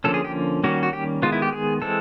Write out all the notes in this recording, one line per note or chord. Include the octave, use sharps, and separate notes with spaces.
D3 F3 A#3 C#4 A4
G#4
G4
D#3 G3 A#3 C#4 F#4
F#4
G4
D#3 G#3 B3 F4
E4
G4
G#4
E3 G#3 C4 A4